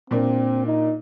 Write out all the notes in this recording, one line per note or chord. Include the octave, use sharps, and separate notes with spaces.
A#2 A#3 C4 D4
D#4